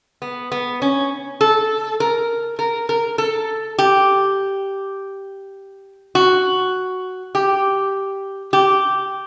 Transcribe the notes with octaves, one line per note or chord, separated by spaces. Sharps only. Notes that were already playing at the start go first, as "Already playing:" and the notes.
B3
B3
C#4
A4
A#4
A#4
A#4
A4
G4
F#4
G4
G4